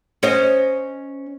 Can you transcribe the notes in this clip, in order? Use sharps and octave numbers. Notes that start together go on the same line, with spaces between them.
C#4 C5 D#5